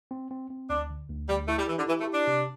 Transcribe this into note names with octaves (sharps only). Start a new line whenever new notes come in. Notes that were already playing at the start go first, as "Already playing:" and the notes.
C4
C4
C4
D2 D4
D3
D2
D2 G3
A3 E4
G3
E3 G4
D3
E3 E4
A3
G4
D4
C3